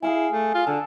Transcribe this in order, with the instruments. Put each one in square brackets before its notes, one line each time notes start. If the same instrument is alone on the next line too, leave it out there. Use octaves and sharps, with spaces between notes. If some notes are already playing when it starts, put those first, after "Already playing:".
[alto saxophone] E4 [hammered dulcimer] G#4 F5 G#5
[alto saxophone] A3
F4
[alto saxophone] D3 [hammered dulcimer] A4